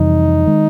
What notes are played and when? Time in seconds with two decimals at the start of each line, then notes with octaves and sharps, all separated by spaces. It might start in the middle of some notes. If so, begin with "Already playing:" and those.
Already playing: F2 C3 E3 G3 D#4
0.46 D#3 G#3